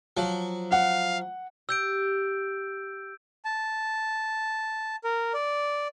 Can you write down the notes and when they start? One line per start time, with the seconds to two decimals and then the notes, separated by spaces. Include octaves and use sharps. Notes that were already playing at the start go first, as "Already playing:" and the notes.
0.17 F3 F#3
0.72 F5 F#5
1.69 G4 E6 G6 D7
3.45 A5
5.04 A#4
5.34 D5